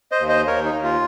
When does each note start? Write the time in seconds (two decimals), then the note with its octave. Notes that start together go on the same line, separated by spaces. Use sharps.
0.11 C5 D#5
0.20 D#2
0.29 C5 D#5
0.47 D#2 A#4 C#5
0.65 D#4
0.74 D#2
0.84 F4